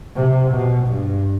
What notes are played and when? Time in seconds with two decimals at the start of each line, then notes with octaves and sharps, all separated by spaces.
0.16 C3
0.52 B2
0.87 G2